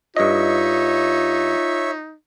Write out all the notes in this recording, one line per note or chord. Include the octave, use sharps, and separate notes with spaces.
G2 D#4 F4 C#5 D#5 E5